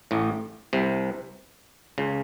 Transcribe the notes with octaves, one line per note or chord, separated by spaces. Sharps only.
A1 A2
C2 C3
C#2 C#3